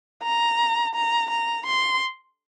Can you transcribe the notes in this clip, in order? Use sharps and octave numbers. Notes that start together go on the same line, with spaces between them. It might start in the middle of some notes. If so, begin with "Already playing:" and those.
A#5
A#5
A#5
C6